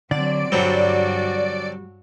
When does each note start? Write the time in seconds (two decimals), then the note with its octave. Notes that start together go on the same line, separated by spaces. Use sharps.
0.11 D3 F#3 C4 D5
0.52 G2 D3 F#3 G3 C4 F#4